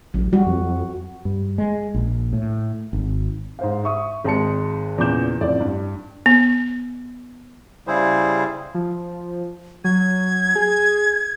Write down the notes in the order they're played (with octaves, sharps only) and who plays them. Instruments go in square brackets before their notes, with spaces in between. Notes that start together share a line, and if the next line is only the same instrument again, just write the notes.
[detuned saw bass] A1 [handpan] F#3
[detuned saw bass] G3 [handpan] F#4
[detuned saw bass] F2
F2
[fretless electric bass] G2
G#3
A#1
A2
G#1
[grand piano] G#2 C5 F5
E5 C#6 D#6
G#1 G#3 A5 C#7
E2 A#2 C#3 D6 G6 E7
A1 F2 D5
G2
[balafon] B3
[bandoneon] C#3 G3 E4 G#4 C5
[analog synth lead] F3
[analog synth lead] F#3 [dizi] G#6
[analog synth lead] G#4